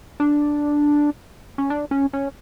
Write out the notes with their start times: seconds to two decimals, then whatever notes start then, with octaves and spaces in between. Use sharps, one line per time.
0.20 D4
1.58 C#4
1.70 D4
1.91 C#4
2.13 C#4